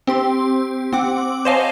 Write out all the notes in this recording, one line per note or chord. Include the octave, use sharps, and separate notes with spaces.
C4 G4 C6
C4 F#5 D6
C5 C#5 D#5 F5 G#5 A5